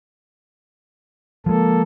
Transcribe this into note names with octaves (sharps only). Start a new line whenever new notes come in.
F3 G#3 A#3 A4